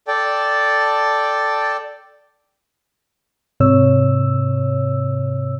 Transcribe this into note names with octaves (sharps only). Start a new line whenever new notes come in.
A4 D5 G5 A5
G#2 C3 C#5 E6